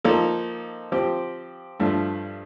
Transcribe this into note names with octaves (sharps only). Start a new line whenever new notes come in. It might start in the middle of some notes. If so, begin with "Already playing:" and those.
F3 A#3 D#4 A4
F3 C4 G4
G2 F3 A3